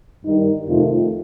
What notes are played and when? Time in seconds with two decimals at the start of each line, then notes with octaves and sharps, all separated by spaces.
0.24 G2 D#3 G3 D#4
0.67 F2 C3 D#3 A3 D#4 F4